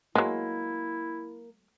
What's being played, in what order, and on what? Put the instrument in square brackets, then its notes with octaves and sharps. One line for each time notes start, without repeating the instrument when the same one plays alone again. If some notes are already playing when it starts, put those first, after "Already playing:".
[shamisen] F#3 G#3 [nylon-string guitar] A#3 [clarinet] E4